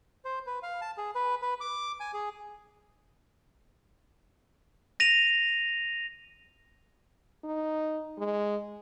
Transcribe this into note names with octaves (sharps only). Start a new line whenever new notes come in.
C5
B4
F5
A5
G#4
B4
B4
D6
G#5
G#4
A#6 D#7 F7
D#4
G#3